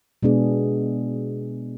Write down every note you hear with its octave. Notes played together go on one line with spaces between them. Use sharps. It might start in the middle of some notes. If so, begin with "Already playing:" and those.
B2 G#3 B3 D4 G#4